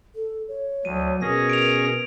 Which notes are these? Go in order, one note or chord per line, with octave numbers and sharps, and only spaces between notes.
A4
C#5
D2 F#3 D#7
B2 C#4 G#4 A#4 A#6
D7 F7